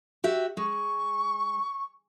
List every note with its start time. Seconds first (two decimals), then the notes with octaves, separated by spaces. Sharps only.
0.24 F#4 G4 E5
0.57 G#3 C#6